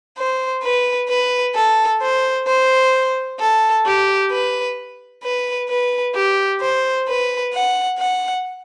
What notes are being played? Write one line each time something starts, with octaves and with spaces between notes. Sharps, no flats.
C5
B4
B4
A4
C5
C5
A4
G4
B4
B4
B4
G4
C5
B4
F#5
F#5